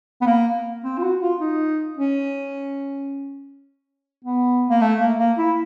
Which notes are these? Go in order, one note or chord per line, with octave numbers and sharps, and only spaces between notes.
B3
A#3
C4
F4
F#4
F4
D#4
C#4
B3
A#3
A3
A#3
A#3
E4